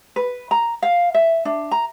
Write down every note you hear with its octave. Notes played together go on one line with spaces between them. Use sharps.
B4
A#5
F5
E5
D4
A#5